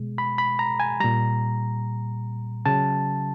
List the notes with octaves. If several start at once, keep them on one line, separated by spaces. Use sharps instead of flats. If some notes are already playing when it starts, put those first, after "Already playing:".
Already playing: B2 G#3
B5
B5
A#5
G#5
A#2 G3 A#5
C#3 F#3 A5